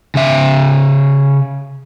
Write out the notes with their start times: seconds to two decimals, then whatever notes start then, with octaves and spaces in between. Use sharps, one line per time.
0.15 C#3 E5